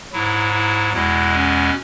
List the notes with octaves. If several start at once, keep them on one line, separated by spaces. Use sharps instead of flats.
G#2 F#3 E4
E4
E2 B2 G#3 E4
C#4